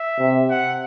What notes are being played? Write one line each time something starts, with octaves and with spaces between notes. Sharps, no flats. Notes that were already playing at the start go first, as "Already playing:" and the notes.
Already playing: E5
C3
F#5